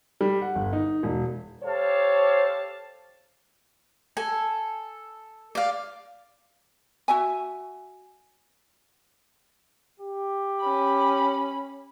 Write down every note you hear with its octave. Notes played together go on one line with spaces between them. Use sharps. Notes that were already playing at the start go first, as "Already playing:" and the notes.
G3
F#5
G1
D#4
E1
G4 A4 C5 C#5 F5 A5
A4 G#5
D5 F5
F#4 E5 G#5
G4
C#4 B5